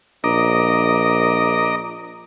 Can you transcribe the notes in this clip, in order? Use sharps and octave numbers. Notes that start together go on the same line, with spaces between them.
A#1 D#5 A#5 D6